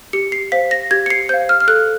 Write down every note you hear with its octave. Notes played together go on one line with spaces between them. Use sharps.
G4 C#7
C7
C5 F5 B6
A#6
G4 G#6
C#7
C7
C5 F5 G6
F6
F6
A4 F#6